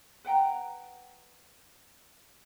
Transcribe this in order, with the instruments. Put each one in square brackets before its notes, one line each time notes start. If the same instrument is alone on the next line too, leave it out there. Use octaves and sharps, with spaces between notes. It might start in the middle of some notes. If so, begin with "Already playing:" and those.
[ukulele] B4 F#5 G5 A#5